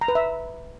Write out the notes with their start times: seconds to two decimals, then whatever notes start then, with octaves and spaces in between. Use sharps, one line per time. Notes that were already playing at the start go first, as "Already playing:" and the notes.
0.01 A#5
0.08 B4
0.15 E5